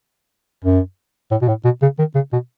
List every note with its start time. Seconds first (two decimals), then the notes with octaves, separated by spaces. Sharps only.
0.64 F#2
1.31 A2
1.42 B2
1.48 A2
1.65 B2
1.82 C#3
1.99 D#3
2.15 C#3
2.32 B2